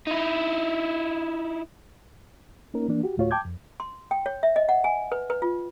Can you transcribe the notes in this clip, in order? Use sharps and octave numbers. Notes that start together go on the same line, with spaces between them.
D#4 E4
A#3 C#4 D#4 A#4
E3 A#3 D4
F#4 G4
D2 A2 A3 F4 F#4 C#5
G5 A5 D6 G6 G#6
F2
C6
G5
C#5
E5
D#5
F#5
G#5
B4
B4
F4